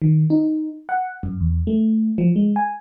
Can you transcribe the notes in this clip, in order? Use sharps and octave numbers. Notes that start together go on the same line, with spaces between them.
D#3
D#4
F#5
F#2
E2
A3
F3
G#3
G#5